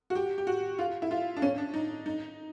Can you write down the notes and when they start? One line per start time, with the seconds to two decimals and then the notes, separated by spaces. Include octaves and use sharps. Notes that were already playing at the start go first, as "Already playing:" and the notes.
0.10 F#4
0.15 G4
0.38 G4
0.47 F#4
0.79 F4
1.02 E4
1.11 F4
1.37 D4
1.42 C#4
1.58 D4
1.74 D#4
2.06 D#4